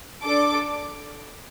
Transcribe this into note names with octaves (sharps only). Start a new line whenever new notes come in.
D4 A4 D6